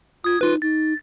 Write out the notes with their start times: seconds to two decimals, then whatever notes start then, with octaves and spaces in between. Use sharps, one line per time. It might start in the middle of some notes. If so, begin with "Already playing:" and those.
0.24 F4 D#6 G#6
0.41 D#4 F4 B4
0.62 D#4 A6